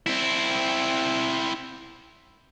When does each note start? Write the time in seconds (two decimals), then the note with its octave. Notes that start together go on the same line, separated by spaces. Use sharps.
0.06 C4 E4